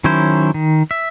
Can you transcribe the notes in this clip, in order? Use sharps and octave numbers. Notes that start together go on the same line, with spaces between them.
D#3 F#3 C#4 E4 C5
D#3
E5